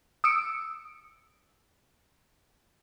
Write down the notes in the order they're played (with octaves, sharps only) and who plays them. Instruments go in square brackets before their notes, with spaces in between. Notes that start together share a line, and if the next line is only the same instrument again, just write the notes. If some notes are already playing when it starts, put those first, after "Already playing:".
[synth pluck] D#6 E6 C#7 D7